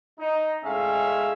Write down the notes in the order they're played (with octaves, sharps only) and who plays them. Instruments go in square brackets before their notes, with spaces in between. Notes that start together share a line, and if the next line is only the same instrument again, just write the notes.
[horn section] D#4
A2 G#3 C#4 E5 F5